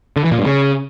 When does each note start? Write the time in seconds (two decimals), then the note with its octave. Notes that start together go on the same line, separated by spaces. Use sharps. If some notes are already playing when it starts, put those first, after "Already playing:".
0.16 D3
0.24 E3
0.31 A#2
0.39 G2
0.46 C#3